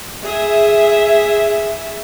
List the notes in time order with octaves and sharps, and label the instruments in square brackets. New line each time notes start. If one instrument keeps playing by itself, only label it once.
[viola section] G#4 E5